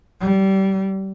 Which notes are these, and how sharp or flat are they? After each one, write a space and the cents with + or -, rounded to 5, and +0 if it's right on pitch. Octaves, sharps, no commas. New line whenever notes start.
G3 -25